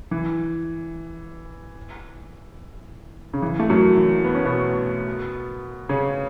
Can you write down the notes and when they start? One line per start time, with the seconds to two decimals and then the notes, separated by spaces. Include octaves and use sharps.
0.11 E3
3.34 C#3
3.42 E3
3.60 A3
3.70 F#2 F#3
3.97 E3
4.24 B3
4.35 C#4
4.45 B2 B3
5.89 C#3 C#4